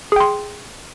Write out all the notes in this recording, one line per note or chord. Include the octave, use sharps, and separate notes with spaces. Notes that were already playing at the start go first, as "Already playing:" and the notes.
G#4 G5 C6